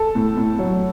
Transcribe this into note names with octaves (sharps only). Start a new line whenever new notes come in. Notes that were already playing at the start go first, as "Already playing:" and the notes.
Already playing: A4
A2
A2
F#3